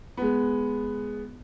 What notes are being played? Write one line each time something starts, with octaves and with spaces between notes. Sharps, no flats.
G#3 B3